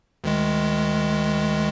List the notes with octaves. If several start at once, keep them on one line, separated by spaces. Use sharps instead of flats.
D2 D#3 G#3